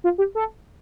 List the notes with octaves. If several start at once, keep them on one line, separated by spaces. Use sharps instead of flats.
F4
G4
A4